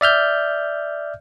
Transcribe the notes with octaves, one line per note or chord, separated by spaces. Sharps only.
D5 E5 F6 G6